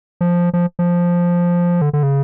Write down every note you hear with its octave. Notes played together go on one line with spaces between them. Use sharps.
F3
F3
F3
D3
D3
C#3